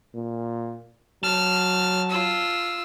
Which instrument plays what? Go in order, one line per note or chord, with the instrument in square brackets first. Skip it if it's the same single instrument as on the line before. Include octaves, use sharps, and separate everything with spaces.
[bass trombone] A#2
[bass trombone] F#3 [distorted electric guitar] A5 [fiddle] F6
[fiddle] F4 E6